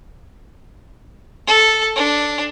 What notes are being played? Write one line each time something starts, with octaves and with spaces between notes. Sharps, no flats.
A4
D4